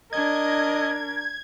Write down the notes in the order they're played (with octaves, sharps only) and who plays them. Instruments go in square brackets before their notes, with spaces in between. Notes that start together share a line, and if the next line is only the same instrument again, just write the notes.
[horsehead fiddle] D4 A#4 [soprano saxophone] D#5 [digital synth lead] G#6